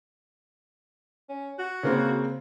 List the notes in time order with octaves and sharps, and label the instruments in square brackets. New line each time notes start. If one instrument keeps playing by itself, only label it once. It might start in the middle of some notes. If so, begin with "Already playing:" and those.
[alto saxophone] C#4
F#4
[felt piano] C#3 A#3 C4